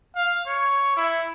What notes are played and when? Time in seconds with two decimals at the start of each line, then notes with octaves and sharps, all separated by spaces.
0.16 F5
0.47 C#5
0.97 E4